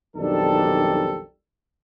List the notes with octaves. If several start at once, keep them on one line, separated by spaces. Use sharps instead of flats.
B1 F2 D#3 G3 D4 A4